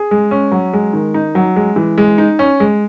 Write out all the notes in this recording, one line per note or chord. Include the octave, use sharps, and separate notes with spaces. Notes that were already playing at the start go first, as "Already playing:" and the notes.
Already playing: G#4
G#3
C#4
F#3
G#3
D#3
D#4
F#3
G#3
E3
G#3
D#4
C#4
G#3